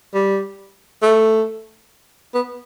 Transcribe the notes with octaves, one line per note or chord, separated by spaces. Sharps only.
G3
A3
B3